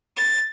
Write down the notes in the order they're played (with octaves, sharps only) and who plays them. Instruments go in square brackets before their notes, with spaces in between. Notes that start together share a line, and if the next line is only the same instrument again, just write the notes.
[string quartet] A6